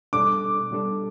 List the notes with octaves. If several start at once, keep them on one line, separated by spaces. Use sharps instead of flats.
B2 G3 D4 A4 D6
B2 G3 D4 A4